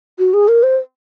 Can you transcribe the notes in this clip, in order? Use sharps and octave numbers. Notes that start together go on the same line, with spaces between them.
F#4
G#4
A#4
C5